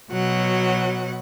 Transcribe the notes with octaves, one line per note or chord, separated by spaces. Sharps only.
B2 F#3 F#5